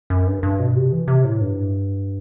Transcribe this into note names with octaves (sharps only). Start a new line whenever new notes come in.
F#2
G2
G2
B2
C3
E3
C3
A2
G2